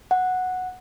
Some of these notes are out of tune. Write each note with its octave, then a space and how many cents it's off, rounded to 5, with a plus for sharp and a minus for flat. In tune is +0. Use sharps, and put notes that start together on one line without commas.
F#5 -5